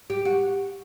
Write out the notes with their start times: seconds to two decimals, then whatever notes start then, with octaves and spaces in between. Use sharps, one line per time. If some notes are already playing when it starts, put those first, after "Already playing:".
0.10 G4
0.25 F#4